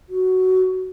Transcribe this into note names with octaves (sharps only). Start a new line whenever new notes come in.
F#4